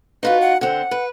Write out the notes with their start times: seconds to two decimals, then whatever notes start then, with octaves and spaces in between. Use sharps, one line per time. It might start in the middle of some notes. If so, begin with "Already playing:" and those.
0.23 D#4 F4 F#4 B4
0.41 F#5
0.61 D3 C4 F#5
0.91 B4